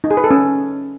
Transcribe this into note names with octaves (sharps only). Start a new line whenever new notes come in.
D#4
G#4
B4
A4
C#4